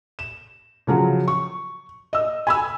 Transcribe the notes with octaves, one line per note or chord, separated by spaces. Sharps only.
E7
C#3 F3 F#3
C#6
D#5 E6
G#5 B5 E6